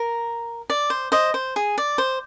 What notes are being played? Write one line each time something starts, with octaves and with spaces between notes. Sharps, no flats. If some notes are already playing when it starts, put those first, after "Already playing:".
Already playing: A#4
D5
C5
C5 D#5
C5
G#4
D5
C5